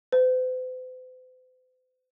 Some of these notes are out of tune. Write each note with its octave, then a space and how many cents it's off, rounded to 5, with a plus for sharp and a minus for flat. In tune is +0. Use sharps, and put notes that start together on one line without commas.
C5 -45